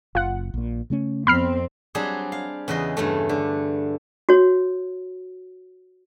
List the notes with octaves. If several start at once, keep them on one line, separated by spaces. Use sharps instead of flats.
F#1 F4 F#5
A#1 A#2
C#3 A3 C#4
F2 B3 C4 B5 F6 C7
F#3 G3 C4 D4 G#4
F5
E2 C#3 B4 D#5 C6
G2 C#3 A3
D3
F#4 C#5